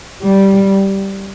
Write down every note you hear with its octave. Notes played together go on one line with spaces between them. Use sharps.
G3